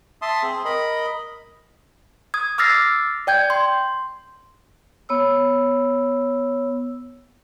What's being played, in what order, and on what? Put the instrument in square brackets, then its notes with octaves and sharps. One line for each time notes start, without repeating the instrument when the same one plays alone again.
[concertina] E5 A5 C6 D#6
C4 G#4 C5
A#4 D#5 B5
[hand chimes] D#6 G#6
D6 E6 F6 A6 A#6 C7
D5 G5 G6 G#6
C6
[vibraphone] B3 C#5 E6